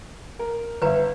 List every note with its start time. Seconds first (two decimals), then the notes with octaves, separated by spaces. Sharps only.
0.39 A#4
0.82 G1 B4 E5 A#5